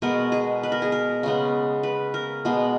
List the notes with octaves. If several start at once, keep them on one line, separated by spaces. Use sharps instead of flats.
B2 G#3 B3 A#4
G#4
B4
A#4
G#4
A#4
C#3 G#3 B3
B4
A#4
B2 G#3 B3